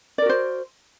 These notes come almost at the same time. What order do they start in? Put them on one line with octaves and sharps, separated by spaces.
D5 A#4 F#4 C5